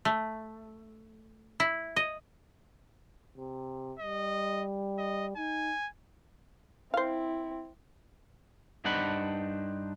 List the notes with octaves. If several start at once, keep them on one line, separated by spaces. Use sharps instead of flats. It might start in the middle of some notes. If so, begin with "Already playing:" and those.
A3
E4
D#5
C3
G3 D#5
D#5
D#4 G#5
C4 E4 C5 F5
G2 D4 D#4 C5 F#5 B5